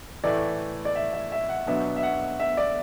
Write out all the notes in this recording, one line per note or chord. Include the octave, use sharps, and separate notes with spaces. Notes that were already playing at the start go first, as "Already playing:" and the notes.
A2 E3 A3 D5
D5
E5
E5
E5
F#5
B2 F#3 B3 D4 E5
E5
F#5
E5
D5